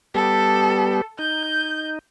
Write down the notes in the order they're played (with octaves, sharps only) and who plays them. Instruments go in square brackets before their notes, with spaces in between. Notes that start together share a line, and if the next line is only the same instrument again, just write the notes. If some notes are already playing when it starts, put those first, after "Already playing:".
[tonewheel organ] G3 B3 G4 [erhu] A4
[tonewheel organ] D#4 [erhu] G6